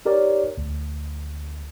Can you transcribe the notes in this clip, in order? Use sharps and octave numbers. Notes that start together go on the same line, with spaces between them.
D#4 G4 A#4 C#5 D5
D2